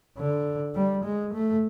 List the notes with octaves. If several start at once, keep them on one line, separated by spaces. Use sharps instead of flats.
D3
G3
G#3
A3